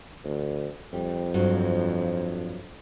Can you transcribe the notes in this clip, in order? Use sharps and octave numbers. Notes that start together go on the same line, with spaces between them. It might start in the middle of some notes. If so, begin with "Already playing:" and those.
D2
F2 G3
G2 F3 F#3